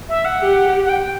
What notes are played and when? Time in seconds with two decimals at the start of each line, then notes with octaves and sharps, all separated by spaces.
0.09 E5
0.25 F#5
0.40 G4
0.84 F#5
0.89 G5